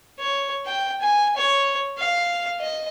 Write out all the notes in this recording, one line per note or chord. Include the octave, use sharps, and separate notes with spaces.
C#5
G5
G#5
C#5
F5
D#5